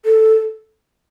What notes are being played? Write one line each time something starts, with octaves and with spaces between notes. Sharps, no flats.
A4